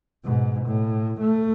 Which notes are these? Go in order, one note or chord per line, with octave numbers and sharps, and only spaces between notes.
G#2 B2
A2
A3